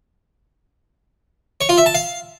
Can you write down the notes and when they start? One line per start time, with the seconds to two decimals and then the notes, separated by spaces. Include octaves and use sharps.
1.61 C#5
1.69 F4
1.78 E5
1.86 A5
1.95 F5